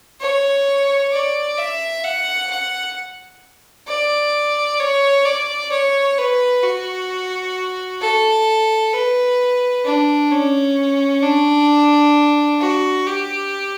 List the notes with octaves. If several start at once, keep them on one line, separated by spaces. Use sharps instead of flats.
C#5
D5
E5
F#5
F#5
D5
C#5
D5
C#5
B4
F#4
A4
B4
D4
C#4
D4
F#4
G4